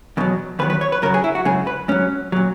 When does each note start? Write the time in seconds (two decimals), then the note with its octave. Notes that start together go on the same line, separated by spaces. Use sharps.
0.17 E2 B2 F#3
0.59 E2 D#3 F#3 B4
0.70 B4
0.81 C#5
0.92 B4
1.02 F#2 C#3 F#3 A#4
1.14 G#4
1.24 E4
1.35 F#4
1.45 F#2 C#3 G#3 G#4
1.67 B4
1.88 G#2 F#3 C#4
2.32 A#2 F#3